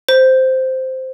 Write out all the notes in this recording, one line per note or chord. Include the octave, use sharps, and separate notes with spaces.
C5